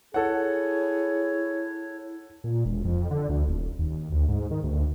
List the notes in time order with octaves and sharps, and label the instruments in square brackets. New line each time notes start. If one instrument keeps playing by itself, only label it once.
[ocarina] E4 [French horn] G#4 [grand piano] A4 F#5 [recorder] C#5
[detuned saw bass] A#2
E1
F2
D3
D2
D#1
D#2
D2
G#2
D#3
D2